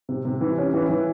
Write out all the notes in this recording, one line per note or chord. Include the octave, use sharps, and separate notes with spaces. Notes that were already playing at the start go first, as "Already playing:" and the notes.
C3
C3
E3
C#4
E3
E3